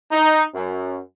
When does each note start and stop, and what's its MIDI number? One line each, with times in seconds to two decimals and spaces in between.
0.12 0.42 63
0.54 0.98 42